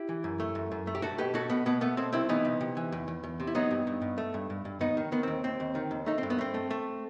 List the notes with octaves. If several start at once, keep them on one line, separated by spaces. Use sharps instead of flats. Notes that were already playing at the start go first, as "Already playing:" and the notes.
Already playing: E4 G4
E3
F#2
A3
F#2
F#2
A3
G4
C2 F#4 A4
B2 G4 B4
B2 F#4 A4
B2 B3
B2 B3
A3 B3
B2 C4
C2 C4 E4
E3 B3 D#4
C3
C3
E3
E2
E2
E2
C3
E4
F#3 B3 D#4
G2
G2
G2
A3
G2
G2
G2
D#2 B3 D#4
D#3
D#3 B3
D#2 C4
D#2 C4
D#2
D#3
D#2
A3 D#4
C4
G2
B3
A3 C4
A3
A3